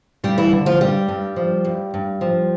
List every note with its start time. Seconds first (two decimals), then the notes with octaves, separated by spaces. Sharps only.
0.24 G2 G3 G4
0.38 E3 E4
0.52 D3
0.66 F3 F4
0.80 G2 G3 G4
1.08 G2
1.36 F3
1.65 G2
1.94 G2
2.21 F3